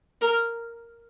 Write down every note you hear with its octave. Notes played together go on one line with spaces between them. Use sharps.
A#4